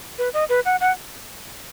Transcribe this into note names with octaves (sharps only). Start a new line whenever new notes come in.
B4
D#5
B4
F#5
F#5